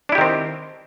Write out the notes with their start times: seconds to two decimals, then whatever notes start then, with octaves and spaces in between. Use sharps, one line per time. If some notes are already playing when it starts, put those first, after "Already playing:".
0.09 D4
0.12 E4
0.15 G4
0.18 D#3
0.21 C4